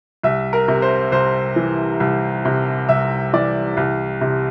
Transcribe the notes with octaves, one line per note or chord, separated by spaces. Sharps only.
C2 E5
A#4
C3
C5
C2 C5
E3
C2
C3
C2 E5
E3 D5
C2
C3